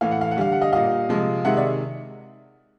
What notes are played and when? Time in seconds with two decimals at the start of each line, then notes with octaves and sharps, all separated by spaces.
0.01 A2 E3 A3 F5
0.11 F#5
0.21 F5
0.31 F#5
0.37 D3 G3 F5
0.52 F#5
0.61 D#5 F5
0.72 A#2 G3 D#5 F5
1.09 C3 F3 G#3
1.45 C3 D#3 G#3 E5 F#5
1.57 D5 E5